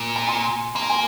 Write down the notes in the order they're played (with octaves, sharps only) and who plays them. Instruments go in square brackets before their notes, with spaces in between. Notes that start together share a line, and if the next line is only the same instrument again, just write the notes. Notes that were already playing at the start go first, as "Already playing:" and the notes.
Already playing: [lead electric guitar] A#2
[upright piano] A#5
G#5 C6
[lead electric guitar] A#3 [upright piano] C6
[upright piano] A#5
G#5